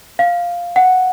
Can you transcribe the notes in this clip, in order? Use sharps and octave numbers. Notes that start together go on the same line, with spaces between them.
F5
F#5